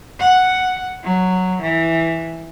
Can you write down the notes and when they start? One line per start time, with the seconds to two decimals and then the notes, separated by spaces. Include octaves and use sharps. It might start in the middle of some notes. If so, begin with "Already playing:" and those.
0.20 F#5
1.04 F#3
1.62 E3